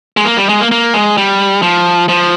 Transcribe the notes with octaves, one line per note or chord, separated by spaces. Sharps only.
G#3
A#3
G3
G#3
A#3
A#3
G#3
G3
F3
F3